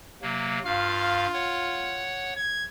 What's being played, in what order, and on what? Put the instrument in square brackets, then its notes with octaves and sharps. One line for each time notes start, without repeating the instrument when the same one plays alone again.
[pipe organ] C3 F#3 A#3
[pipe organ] G2 F5 F6 [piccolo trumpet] F4
[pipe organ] C#5 F#5
[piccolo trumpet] G#6